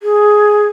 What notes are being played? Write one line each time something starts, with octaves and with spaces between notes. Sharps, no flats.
G#4